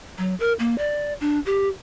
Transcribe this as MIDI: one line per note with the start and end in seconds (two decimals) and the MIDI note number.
0.18 0.35 54
0.40 0.53 70
0.59 0.77 58
0.78 1.13 74
1.21 1.39 62
1.46 1.68 67